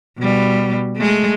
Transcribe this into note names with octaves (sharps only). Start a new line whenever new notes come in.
B2 G3
G#3 A3